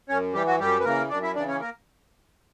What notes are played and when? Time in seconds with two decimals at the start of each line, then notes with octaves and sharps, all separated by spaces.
0.09 F#2 C#4 C#5
0.34 E3 G3 G4
0.47 F#3 F#4
0.59 F#2 G3 G4
0.80 B4
0.85 C#3 E3 A#3 A#4
1.10 F#2 D4 D5
1.23 E4 E5
1.35 C#3 E3 D4 D5
1.48 C#4 C#5
1.61 A#3 A#4